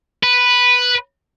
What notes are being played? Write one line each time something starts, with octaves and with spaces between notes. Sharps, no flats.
B4